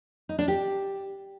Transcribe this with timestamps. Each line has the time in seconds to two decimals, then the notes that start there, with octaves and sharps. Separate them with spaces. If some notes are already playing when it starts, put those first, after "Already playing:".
0.29 D#4
0.39 D4
0.48 G4